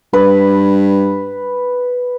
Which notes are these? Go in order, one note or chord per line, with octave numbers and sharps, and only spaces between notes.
G2 B4